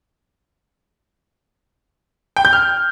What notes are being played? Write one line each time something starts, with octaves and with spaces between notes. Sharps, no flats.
G5
G6
F6